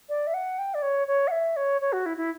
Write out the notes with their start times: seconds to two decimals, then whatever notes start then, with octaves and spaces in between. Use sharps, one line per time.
0.09 D5
0.27 E5
0.34 F#5
0.59 G5
0.74 D5
0.82 C#5
1.08 C#5
1.28 F#5
1.31 E5
1.56 C#5
1.81 C#5
1.93 F#4
2.06 E4
2.17 E4